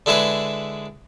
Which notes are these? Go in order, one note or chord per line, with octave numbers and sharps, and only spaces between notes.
D3 G#3 E4 G#4 B4